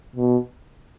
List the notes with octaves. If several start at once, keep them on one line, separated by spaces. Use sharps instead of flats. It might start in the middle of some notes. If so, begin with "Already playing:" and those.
B2